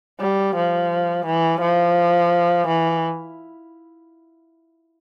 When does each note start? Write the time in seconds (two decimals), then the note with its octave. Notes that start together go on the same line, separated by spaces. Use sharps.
0.20 G3
0.56 F3
1.26 E3
1.61 F3
2.68 E3